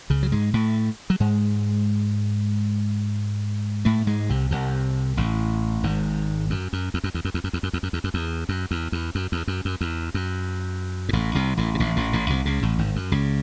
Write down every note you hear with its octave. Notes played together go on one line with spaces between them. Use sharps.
C#2 C#3
F#3
G#2 G#3
A2 A3
F#3
G#2 G#3
A2 A3
G#2 G#3
C2 C3
C2 C3
A1 A2
G#1 G#2
F#2
F#2
E2
F#2
E2
F#2
E2
F#2
E2
F#2
E2
F#2
E2
F#2
E2
F#2
E2
E2
F#2
E2
F#2
F#2
E2
F#2
G#2
A1 A2
C2 C3
A1 A2
C3
A1 A2
A1 A2
A1 A2
C2 C3
C#2 C#3
A1 A2
G#1 G#2
F#2
C#2 C#3